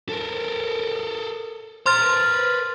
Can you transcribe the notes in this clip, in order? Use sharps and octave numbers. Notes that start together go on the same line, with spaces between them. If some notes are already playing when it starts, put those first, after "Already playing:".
A4 A#4
C5 A#5 C6 F6 A6
A#4 B4